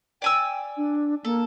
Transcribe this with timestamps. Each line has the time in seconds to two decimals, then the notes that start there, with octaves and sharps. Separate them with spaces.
0.22 D5 G5 G#5 E6
0.77 D4
1.25 A#3 A4